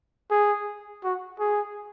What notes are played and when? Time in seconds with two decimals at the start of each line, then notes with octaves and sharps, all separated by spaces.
0.31 G#4
1.04 F#4
1.39 G#4